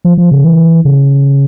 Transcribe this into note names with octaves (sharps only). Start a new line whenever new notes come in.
F3
F3
C#3
E3
C#3